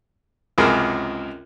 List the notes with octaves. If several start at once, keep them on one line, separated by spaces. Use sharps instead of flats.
C#2 F#2 C3 G#4 A#4